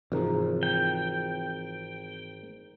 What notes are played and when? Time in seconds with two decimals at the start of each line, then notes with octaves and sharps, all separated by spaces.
0.12 G#1 C3 E3 F3 G#4 C5 A#5
0.63 G5